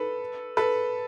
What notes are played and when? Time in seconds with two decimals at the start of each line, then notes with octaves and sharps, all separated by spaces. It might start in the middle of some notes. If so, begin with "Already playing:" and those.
Already playing: A4 B4
0.57 A4 B4